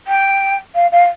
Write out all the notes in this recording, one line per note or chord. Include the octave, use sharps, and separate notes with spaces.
G5
F5
F5